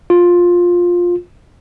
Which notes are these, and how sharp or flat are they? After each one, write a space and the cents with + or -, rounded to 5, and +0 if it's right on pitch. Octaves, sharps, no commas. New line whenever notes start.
F4 +10